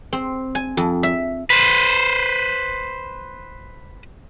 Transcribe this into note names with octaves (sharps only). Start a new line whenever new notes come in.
C4
G#5
F2
E5
B4 C5